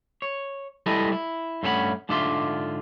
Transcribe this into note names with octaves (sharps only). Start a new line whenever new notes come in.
C#5
G3 G#3 E4 A4 B4 D#5
E4
G2 A3 C#4 A4 F#5 B5
G#2 D3 D4 F4 E5 C6